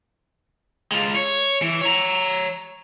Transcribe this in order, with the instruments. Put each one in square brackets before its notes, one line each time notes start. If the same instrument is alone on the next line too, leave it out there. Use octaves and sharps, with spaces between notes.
[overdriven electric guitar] G#3 F4
C#5
E3
C#5 A#5